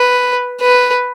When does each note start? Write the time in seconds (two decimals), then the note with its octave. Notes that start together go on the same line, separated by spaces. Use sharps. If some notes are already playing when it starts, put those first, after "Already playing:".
Already playing: B4
0.61 B4